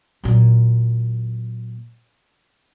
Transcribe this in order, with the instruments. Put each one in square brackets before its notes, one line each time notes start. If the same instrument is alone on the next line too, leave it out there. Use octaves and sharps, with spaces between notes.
[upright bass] A#2 F#3